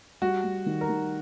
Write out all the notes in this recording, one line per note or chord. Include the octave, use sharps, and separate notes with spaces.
G3 F#4
G3
D#3
A#4
D#3